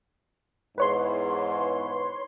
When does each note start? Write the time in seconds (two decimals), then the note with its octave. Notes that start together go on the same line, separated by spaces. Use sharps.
0.78 E2 G#2 B4 C#5 C6